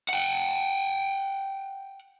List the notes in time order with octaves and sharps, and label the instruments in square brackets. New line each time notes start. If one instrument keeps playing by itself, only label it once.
[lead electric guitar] F#5 G5